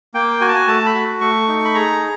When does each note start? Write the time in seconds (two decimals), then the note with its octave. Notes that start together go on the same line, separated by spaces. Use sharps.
0.14 A#3 G5
0.41 F#4 G#5
0.48 A5
0.55 G#5
0.68 A3 A5
0.86 B5
0.94 F#4
1.21 A3 C#6
1.48 D#4
1.65 B5
1.74 G#4 A#5